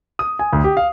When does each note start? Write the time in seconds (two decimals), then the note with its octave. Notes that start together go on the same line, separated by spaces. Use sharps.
0.19 D#6
0.39 G#5
0.53 D2
0.64 G4
0.77 F5